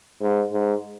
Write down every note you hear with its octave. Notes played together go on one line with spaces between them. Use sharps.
G#2
G#2